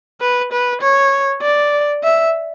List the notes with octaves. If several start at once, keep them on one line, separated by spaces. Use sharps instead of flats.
B4
B4
C#5
D5
E5